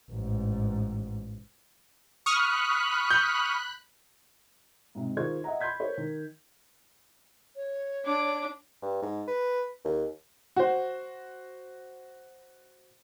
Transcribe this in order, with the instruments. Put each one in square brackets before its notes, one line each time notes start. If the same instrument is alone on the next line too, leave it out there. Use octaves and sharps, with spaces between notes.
[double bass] A1 G#2
[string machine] B5 F#6 [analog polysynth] C#6 D#6 F6
[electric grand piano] G6
[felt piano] G#2 C3
D#3 F4 G#4 C5 C#6 G#6
D#5 E5 F#5 A#5
B5 C6 G6 G#6 B6
A#4 C5 C#5
D#3
[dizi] C#5
[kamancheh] D4 D6
[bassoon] G2
G#2
B4
D#2
[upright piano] F#4 C5